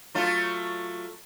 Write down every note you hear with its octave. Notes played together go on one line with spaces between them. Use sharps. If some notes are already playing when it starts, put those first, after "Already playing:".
F#3 A3 F4